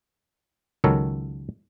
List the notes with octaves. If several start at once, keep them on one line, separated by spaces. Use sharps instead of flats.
C#2 D#3 F#3 A4 A#4 C#5